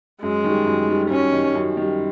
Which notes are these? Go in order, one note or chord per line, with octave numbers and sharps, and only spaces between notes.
F#2 G#3
D#3 G3
F#2
D#3 G3
F#2 C#4
D#3 G3
F#2
D#3 G3